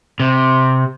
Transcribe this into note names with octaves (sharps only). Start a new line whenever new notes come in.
C3